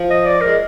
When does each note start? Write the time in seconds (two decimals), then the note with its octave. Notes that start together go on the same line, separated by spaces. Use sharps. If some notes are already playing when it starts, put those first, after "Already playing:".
Already playing: F3
0.10 D#5
0.26 D5
0.41 G#3 A#4